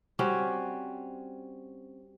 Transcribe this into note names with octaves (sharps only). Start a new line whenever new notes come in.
G3 C4 C#4 F#4